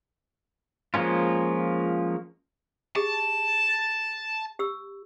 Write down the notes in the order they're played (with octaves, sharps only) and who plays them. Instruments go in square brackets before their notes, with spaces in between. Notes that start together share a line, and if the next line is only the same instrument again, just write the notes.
[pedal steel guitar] F3 G#3 A#3 C#4 F4
[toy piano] G4 G#4 [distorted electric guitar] A5
[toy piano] G4 E6